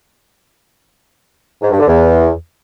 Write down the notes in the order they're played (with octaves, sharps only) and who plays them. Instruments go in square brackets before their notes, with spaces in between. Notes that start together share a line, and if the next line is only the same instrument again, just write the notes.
[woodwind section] G#2
G2
D3
E2